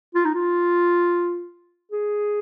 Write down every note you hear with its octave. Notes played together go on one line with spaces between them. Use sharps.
F4
D#4
F4
G#4